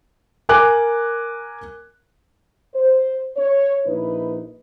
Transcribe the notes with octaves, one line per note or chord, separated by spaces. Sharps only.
A#4 G#5 D6 F#6
C5
C#5
A#1 D#4 E4 B4